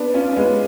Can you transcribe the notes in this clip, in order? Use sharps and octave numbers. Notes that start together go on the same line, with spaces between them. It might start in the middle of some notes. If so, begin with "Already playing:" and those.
Already playing: B3 D4
C#4 F4
C#4
G#3 B3